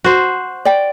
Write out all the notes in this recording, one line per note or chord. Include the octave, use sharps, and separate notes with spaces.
F#4 C5
D5 G5